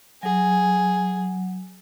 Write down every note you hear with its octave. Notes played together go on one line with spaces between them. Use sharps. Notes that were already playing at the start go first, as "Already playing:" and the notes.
F#3 G#4